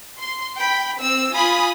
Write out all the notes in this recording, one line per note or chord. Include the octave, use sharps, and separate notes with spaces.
C6
G5 B5
C4 E6
F4 G#5 B5 D#6